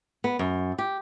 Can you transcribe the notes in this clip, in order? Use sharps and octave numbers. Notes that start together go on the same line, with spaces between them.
B3
F#2
G4